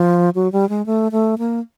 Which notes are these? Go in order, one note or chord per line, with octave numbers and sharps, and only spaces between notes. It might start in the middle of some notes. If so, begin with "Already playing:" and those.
Already playing: F3
F#3
G3
G#3
A3
A3
A#3